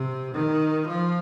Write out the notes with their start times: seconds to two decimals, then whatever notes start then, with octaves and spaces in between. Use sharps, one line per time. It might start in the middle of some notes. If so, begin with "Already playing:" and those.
Already playing: C3
0.33 D#3
0.86 F3